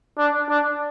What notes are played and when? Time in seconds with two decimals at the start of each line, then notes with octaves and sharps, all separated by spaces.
0.18 D4
0.49 D4